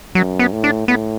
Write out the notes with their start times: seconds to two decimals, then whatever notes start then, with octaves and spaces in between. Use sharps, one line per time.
0.15 F#2 F#3
0.39 B3
0.52 A2
0.64 D4
0.88 A2 B3